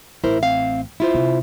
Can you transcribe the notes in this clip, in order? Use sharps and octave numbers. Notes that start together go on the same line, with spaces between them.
A1 E4 A#4 C5
C4 F5
E4 F4 C5
C3